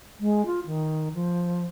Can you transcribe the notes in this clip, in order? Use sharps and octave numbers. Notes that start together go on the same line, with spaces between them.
G#3
F4
D#3
F3